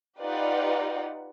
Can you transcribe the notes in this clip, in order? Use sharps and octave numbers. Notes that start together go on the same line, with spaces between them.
D#4 F4 G4 B4 D5 F#5